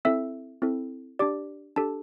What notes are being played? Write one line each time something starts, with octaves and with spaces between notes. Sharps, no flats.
C4 E4 A4 E5 E6
C4 E4 A4
D4 G4 D5 D6
D4 G4 A4 A5